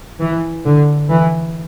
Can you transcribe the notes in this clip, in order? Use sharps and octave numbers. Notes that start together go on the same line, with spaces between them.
E3
D3
E3